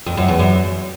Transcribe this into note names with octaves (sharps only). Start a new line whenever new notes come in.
F2
F#2
E2
F#2